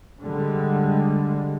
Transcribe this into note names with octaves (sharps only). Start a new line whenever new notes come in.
D3 G3 G#3